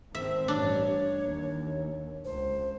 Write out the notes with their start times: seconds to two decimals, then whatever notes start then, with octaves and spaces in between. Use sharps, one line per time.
0.15 G#1 C4 E5
0.48 A1 G2 D4 C#5
1.25 D#2
2.25 C#2 C5